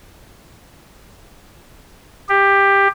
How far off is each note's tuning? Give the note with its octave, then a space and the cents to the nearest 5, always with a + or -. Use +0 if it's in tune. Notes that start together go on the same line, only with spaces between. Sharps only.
G4 +15